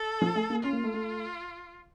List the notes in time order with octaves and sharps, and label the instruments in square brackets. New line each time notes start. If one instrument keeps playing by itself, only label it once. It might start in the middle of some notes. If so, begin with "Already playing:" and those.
Already playing: [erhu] A4
[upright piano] F3
A3
A#3
[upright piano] C#4 [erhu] F4
[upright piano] A#3
A3
A3